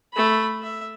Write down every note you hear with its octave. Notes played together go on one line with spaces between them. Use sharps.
A3 B5
E5